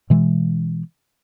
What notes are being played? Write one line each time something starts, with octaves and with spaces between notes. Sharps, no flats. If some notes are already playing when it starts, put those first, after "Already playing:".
B2 E3 G#3